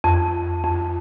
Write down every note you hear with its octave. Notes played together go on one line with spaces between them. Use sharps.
F2
F2